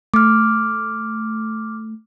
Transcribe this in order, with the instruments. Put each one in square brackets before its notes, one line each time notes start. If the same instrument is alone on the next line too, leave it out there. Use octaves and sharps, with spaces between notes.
[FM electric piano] A3 [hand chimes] D6 F6